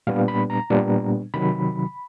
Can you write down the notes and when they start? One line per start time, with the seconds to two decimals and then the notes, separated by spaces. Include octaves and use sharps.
0.07 A#2 G3 B3 D4 F5
0.28 B5
0.50 A#5
0.70 A#2 G3 B3 D4
1.34 C3 D#3 F#3 B5